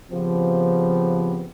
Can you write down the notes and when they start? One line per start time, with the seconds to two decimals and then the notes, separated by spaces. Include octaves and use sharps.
0.11 C#3 F3 B3 C4 G4